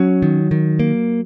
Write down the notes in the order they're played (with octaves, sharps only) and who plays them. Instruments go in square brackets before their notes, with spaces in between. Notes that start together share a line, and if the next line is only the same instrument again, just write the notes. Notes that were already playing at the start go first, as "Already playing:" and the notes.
Already playing: [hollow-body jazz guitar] F#3 [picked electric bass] C#4
[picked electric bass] D#3
D#3
A#3